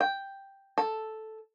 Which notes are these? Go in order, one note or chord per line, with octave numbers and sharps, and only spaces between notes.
G5
A4